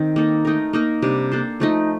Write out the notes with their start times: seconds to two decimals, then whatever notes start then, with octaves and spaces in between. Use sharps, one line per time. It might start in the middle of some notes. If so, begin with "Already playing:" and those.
Already playing: D#3 C4
0.16 A#3 D#4 A4
0.45 A3 D#4 A#4
0.73 A#3 D#4 A#4
1.02 C3 G3 D4
1.32 A#3 D4 A4 C5
1.60 F3 A3 D#4